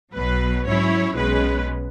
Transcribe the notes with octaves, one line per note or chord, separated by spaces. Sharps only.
B1 B2 F#3 B4
G#2 F#3 C#4 E4 C#5
B1 B2 G#3 C#4 B4